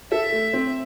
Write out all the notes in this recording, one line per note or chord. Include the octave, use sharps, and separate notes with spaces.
A4 E5
A3
C4